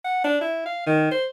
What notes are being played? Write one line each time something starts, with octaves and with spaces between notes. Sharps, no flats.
F#5
D4
E4
F5
D#3
C5